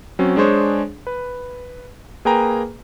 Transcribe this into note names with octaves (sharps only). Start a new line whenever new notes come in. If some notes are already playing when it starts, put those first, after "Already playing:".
F#3 C4 C#4
G#3 D4 G#4 C5 C#5
B4
A#3 G#4 B4 G5 G#5 A#5